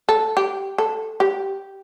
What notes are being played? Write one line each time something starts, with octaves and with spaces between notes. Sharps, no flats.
A4
G4
A4
G4